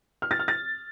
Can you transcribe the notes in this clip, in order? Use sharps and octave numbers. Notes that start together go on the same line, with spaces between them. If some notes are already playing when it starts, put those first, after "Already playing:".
F6
A6
F6
A6